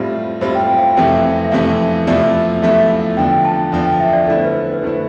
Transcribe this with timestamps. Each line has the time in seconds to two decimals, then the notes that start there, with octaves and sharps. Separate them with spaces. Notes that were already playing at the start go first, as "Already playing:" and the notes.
Already playing: A2 G3 C4 F4
0.41 A2 G3 C4 F4 C5
0.55 G5
0.78 F5
0.82 G5
0.97 F2 C3 E3 A3 C4
1.45 E5
1.51 F2 C3 E3 A3 C4 F5
2.07 E2 C3 F3 A3 E4 D5
2.62 E2 C3 F3 A3 E4 E5
2.89 F5
3.17 E2 D3 F3 G5
3.45 A5
3.72 E2 D3 F3 G5
3.86 G5
4.00 E5
4.13 D5
4.27 D3 A3 E4 D5
4.36 C5
4.45 B4
4.53 C5
4.73 B4
4.82 D3 A3 E4 C5